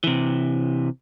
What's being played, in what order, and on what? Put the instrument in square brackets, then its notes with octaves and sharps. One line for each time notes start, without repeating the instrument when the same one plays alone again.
[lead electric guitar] C3 E3